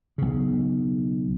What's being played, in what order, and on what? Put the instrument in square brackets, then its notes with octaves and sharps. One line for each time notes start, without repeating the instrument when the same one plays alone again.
[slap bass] B1 C#3